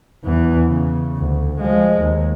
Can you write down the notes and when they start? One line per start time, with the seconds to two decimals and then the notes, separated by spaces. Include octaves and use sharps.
0.24 E2 E3
0.67 C#3
1.17 D2
1.60 F3 G#3
1.99 D#2